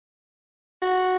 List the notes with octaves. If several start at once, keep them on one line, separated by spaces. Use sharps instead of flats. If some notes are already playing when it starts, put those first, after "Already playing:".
F#4